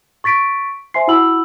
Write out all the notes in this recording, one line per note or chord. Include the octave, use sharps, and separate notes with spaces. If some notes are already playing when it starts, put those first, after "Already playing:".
C#6 A6 B6 D7
C5 E5 G#5 C6 C7
E4 F#4 F#5 B5 E6 F#7